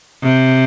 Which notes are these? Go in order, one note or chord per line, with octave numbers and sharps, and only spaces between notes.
C3